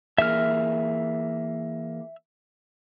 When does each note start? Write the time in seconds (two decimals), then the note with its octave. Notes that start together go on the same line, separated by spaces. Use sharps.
0.18 E3 A#3 G#4 E5 F6